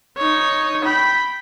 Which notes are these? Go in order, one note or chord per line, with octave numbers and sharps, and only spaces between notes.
D#4 C#5
G5 B5